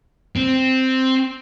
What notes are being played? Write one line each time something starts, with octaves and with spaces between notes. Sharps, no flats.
C4